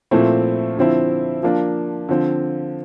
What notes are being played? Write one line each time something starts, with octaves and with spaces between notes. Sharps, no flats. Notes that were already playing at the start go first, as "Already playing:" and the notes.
A#2 F3 A3 C4 E4
D3 F3 C4 E4
F3 A#3 D4
D3 F3 C4